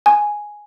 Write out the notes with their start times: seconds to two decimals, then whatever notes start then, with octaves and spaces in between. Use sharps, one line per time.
0.06 G#5